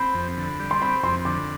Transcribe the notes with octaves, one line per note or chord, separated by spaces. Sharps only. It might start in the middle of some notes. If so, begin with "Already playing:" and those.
Already playing: C4 B5
F2
D3
G3
C6
C4 B5
F2 C6
D3 D6